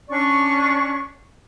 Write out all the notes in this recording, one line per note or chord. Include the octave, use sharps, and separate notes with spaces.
C#4 D4 D5 C#6